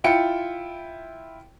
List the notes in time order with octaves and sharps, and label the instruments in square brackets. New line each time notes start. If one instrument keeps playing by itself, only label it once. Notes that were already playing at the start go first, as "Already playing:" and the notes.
[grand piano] E4 F4 G5 C#7